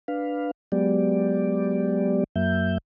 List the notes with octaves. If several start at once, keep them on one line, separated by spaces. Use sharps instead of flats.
D4 B4 F5
F#3 G#3 B3 G4 D5
F#2 F#3 A#3 E5 G6